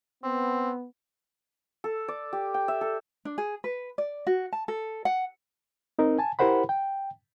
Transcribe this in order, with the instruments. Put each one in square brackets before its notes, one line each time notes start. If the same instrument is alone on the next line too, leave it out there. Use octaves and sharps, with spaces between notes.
[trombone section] B3 [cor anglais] C4
[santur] A4
D5
G4
G5
E5
A4
[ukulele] D4
G#4
B4
D5
F#4
A5
A4
F#5
[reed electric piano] C4 D#4 A#4
G#5 A5
E4 G4 A#4 C5 F#5 B5
G5